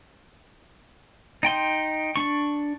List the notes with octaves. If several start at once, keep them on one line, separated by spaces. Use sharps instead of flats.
D#4 G5 C6
D4 C#6